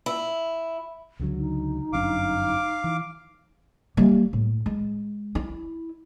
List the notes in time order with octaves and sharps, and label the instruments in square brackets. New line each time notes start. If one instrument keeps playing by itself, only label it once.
[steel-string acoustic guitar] E4
[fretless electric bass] C#2 D3 F#3
[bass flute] D#4
[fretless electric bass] G1 F#2 D4 [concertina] F5 D6
[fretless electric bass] E3
[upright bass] G3 A#3
A2
G#3
E4